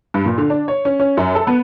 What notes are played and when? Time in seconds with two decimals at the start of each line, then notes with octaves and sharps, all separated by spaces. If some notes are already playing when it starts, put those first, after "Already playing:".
0.14 G2
0.26 A#2
0.38 D3
0.50 D4
0.68 C#5
0.85 C#4
1.00 C#4
1.17 F#2
1.35 A4
1.47 B3